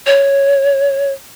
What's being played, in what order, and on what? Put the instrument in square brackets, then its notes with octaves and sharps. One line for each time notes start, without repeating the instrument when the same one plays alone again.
[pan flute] C#5